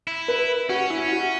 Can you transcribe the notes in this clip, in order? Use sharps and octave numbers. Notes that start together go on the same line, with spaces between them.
E4
B4
C#4 F#4
E4
F#4